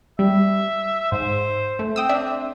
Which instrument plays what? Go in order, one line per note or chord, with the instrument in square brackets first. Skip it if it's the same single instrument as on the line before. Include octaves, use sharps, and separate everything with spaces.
[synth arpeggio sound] G3 [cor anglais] E5
[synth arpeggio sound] G#2 [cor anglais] C5
[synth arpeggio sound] A3
[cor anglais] C4 [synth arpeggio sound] G5 D#6 E6
[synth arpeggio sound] D4 E5